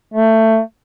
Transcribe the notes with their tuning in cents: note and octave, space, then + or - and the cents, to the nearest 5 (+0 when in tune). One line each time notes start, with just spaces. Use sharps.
A3 +15